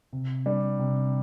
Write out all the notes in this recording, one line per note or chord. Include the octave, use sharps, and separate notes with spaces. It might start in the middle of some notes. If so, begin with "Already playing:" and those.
C3
G3 D4
C3